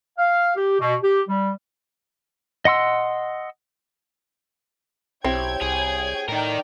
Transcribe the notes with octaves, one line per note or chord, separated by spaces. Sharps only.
F5
G4
B2
G4
G3
D#5 F#5 C6 E6
B1 C4 E4 G4 C#5 G5 G#6
C2 G#4
A2 D#4 A#4 D5 G5 A#5